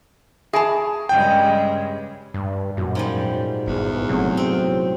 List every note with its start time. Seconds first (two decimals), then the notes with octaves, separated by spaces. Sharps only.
0.53 G#4 E5 G#5 A5 B5
1.09 G2 C#3 G#3 G5
2.34 G2
2.77 F#2 A#2 F#4
2.95 G#2 F3 G3
3.67 G1 E2
4.09 C3 F#3 A3
4.37 C4